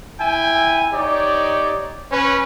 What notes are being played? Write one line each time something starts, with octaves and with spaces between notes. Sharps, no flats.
E4 G5 G#5
D#4 G4 C#5 D5
C#4 B4